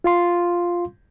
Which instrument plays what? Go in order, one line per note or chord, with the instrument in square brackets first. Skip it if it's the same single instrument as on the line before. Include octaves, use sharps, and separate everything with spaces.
[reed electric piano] F4 F5 C6